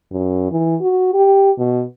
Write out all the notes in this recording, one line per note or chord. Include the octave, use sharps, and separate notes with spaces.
F#2
E3
F#4
G4
B2